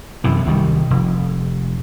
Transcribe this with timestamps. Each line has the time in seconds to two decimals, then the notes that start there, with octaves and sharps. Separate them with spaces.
0.24 F#2 C3 E3
0.46 C2 D#3 G3
0.90 F1